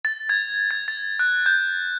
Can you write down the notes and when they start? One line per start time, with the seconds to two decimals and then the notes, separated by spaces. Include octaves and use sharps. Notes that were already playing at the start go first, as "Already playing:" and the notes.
0.05 A6
0.29 G#6
0.71 G#6
0.88 A6
1.19 F#6
1.46 G6